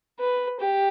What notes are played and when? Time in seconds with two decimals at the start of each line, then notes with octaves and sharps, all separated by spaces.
0.20 B4
0.60 G4